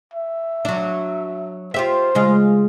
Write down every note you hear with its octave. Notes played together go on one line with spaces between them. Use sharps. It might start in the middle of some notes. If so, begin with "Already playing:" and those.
E5
F#3 D4
F4 G4 C5 E5
C#3 G#3 F4